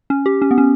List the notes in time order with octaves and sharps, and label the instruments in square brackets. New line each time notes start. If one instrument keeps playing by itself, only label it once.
[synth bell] C#4
G4
C#4
B3
C#4